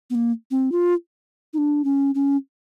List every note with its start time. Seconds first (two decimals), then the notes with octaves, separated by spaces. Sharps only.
0.10 B3
0.15 A#3
0.51 C4
0.72 F4
1.54 D#4
1.58 D4
1.84 C#4
2.15 C#4